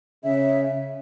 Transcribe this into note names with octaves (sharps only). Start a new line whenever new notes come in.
C#3 C#4 E5